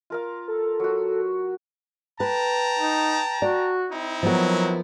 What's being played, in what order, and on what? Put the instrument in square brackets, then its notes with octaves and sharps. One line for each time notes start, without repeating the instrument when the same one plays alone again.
[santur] F4 A#4 F5
[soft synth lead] A4
[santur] F#3 F#4
[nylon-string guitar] B4 [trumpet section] G5 A5 A#5
[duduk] D#4
[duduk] F#4 [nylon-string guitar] D5
[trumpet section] C4 D#4 E4
[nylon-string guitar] F3 B3 A#4 [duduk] F#3